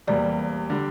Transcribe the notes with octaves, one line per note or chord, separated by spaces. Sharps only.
E2 C3 G3 A#3 D5
D3 G3